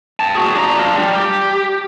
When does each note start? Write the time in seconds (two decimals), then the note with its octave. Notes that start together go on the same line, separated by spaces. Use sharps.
0.20 G5 A5
0.35 F#4 G#4
0.56 D4 A#5
0.78 D4 F4
0.96 G3
1.15 G4